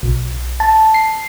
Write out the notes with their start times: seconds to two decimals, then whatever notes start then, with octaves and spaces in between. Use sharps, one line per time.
0.03 B1
0.60 A5
0.94 C7